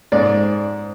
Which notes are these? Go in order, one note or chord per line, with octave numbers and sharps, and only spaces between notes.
G#2 D5